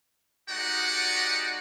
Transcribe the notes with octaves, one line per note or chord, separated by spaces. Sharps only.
G#3 D#4 F#4 G4 D5 F#5